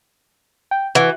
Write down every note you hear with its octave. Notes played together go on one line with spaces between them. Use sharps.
G5
E3 F#4